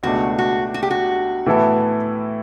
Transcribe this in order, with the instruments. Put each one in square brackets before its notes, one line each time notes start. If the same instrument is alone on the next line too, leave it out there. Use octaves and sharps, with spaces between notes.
[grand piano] C#2 B2 A3 D4 [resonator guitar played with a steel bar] F#4
[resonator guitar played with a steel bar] F#4
F#4
G4
F#4
[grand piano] A2 E3 B3 E4 A4